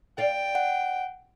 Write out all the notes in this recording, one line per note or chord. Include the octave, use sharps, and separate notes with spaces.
D5 F5 G5
F#5